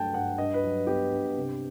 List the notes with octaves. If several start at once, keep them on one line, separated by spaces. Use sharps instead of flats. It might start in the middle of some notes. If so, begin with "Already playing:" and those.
Already playing: G2 F#3 A3 G5 A5
G2 F#5
G2 D#5
B4
F#3
B3 G4
G2
C3